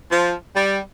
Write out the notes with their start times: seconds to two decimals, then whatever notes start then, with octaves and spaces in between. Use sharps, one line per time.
0.11 F3
0.56 G3